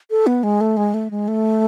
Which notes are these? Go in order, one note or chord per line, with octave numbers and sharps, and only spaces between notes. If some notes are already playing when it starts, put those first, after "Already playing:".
A4
B3
G#3
A3
G#3
A3
G#3
A3